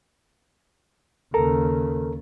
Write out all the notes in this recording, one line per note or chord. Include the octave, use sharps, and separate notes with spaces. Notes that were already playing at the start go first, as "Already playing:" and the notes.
D#2 C#3 A4 A#4 A#5